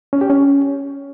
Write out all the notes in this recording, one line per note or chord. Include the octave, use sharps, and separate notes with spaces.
C#4
G4
C#4